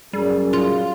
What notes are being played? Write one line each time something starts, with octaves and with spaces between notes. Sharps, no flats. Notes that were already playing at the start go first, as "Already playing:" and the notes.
F#2 G3 G#4
F4